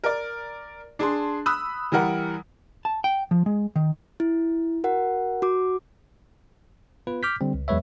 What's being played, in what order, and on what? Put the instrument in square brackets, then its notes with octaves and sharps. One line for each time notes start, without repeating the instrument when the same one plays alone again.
[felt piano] A#4 D5
D4 G#4 A5 C6
B5 D#6 E6 F#6
E3 G3 A#4 F#5
[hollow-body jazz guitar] A5
G5
F3
G#3
D#3
[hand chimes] E4
F#4 A#4 F#5
F#4 D6
[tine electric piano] B3 F4 B4
D6 F6 G6 B6
D3 G3 C4
C#2
E2 F#3 G#3 B4 C#5 E5